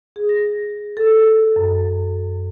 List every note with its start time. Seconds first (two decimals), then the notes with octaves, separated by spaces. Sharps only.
0.16 G#4
0.29 A#6
0.97 A4
1.56 F#2